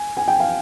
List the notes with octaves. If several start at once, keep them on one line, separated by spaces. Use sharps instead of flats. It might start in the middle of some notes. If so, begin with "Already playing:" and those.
Already playing: G#5
G#5
G5
F5